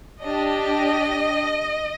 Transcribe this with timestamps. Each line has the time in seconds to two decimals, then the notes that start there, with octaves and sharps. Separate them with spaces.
0.22 D4 G4 D#5